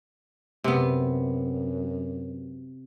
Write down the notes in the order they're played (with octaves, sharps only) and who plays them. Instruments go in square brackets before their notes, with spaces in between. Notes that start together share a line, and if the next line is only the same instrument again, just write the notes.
[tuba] F#2 [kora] C3 B3